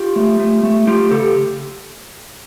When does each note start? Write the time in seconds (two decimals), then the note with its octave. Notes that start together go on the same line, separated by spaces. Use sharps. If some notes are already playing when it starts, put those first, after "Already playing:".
Already playing: F4 G4
0.16 A3
0.40 A3
0.63 A3
0.87 A3 F4 G4
1.11 C#3 G4 A4